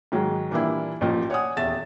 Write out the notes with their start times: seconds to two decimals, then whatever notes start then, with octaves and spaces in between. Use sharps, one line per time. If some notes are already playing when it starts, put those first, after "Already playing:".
0.12 G#2 D#3 F#3 G#3
0.51 A#2 E3 G3 A#3 D4 E4
1.01 A1 A#2 F3
1.30 C#5 D5 F#5 G#5 D#6
1.56 D#1 E2 E5 A6 E7